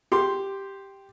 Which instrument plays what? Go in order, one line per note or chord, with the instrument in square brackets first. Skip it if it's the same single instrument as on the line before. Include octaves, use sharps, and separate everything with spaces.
[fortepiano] G4 C6